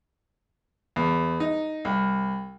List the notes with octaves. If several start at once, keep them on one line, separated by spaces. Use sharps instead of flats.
E2
D#4
C2